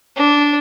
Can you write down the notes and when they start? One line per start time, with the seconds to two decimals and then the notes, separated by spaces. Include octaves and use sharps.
0.16 D4